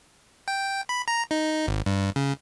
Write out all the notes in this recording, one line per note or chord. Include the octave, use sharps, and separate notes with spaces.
G5
B5
A#5
D#4
G#1
G2
C#3